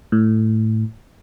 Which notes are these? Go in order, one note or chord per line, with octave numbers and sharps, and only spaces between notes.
A2